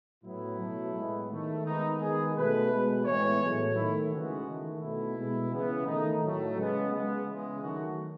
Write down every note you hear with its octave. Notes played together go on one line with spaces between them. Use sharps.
A2 F#3 B3 E4
B2 F#3 A3
A2 G#3 B3
D#3 A3
D#3 G#3 B3 D#4
D#3 G#3 B3 G#4
B2 A3 B4
B2 G#3 B3
A2 E3 G#3 B3 C#5
A2 F#3 A3
D#3 A3 E4
C#3 E3 G#3 B3 F#4
D#3 A3
B2 A3 E4
B2 G#3 B3
C#3 E3 B3
D#3 A3 D#4
A2 F#3 A3
C#3 G#3 B3
C#3 G#3 B3
C#3 E3 G#3
D#3 F#3 A3 F#4